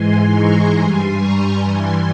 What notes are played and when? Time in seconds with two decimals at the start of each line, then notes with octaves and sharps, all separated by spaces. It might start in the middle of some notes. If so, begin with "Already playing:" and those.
Already playing: G#2 E3 G#3 G#5 C6
0.33 A#5 C#6
0.76 G2 G3 G#5 C6
1.19 A#5 C#6
1.61 G2 E3 G3 G#5 C6